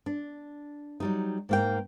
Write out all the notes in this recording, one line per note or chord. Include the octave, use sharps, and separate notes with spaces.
D4
F#3 G3 D#4
G#2 A#3 G5